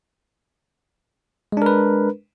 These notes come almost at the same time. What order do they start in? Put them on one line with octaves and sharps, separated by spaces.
G#3 D4 A#4 B4